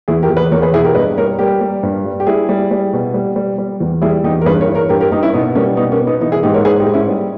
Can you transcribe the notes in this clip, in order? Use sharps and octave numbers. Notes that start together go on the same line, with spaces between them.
E2 E4 G#4
G4 A#4
E2
G#4 B4
E2 A#4 C#5
G#4 B4
B2 E4 G#4
G4 A#4
G2 B4 D#5
G3 A#4 C#5
G3 G4 A#4
G3
G2
G3
G4
G3 E4 G#4
G3
G3
B2
G3
G3
G3
E2
G3 E4 G#4
E2 D#4 G4
A#4
G2 G#4 B4
A#4 C#5
E3
A#4 C#5
G2 G4 A#4
G4 A#4
G2 D#4 G4
C#4 E4
B2 B3 D#4
G3 A#3 C#4
B2 B3 D#4
A#3 C#4
B2
B3 D#4
E3 B3 D#4
E4 G#4
G#2 D#4 G4
A#4 C#5
G#2 G#4 B4
D#4 G4
G#2
C#4 E4
G3